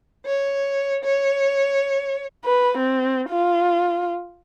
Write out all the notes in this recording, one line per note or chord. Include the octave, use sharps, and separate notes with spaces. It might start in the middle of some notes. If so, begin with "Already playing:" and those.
C#5
C#5
B4
C4
F4